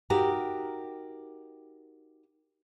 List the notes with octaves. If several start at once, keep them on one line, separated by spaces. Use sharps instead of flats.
D#4 F#4 G4 A#4